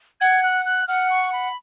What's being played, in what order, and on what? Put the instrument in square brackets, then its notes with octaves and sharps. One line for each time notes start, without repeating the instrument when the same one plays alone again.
[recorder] F#5 [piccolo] G#6
[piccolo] F#6
F#6
[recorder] F#5 [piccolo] F6
[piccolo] C#6
B5